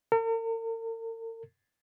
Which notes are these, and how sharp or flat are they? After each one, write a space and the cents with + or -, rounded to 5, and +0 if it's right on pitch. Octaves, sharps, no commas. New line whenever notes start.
A#4 -45